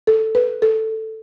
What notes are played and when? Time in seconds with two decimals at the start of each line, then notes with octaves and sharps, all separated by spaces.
0.07 A4
0.35 B4
0.62 A4